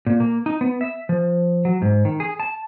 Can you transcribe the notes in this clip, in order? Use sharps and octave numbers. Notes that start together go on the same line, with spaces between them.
A#2
A#3
D#4
B3
E5
F3
F#3
G#2
D#3
G#4
A5